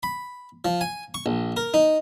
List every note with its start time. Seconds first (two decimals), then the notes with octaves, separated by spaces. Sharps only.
0.03 B5
0.65 F3
0.81 G#5
1.14 C#6
1.26 A#1
1.57 A#4
1.74 D#4